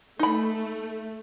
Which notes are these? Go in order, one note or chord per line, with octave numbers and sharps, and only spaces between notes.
A3 D#4 B5